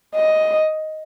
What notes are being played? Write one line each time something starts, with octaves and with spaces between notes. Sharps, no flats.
D#5